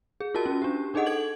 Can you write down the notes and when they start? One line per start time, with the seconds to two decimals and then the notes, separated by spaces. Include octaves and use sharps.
0.20 G#4
0.35 F4 F#4 A#4 A5
0.46 C#4
0.62 D4 G4
0.94 D4 D#4 G#4 A4 D#5 F#5
1.06 A4 G#6 F#7